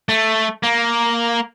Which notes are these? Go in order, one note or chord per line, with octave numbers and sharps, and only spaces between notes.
A3
A#3